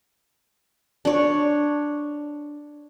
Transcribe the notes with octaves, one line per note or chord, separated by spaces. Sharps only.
D4 C#5